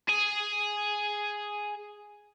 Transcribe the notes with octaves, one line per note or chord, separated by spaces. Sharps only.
G#4 G#5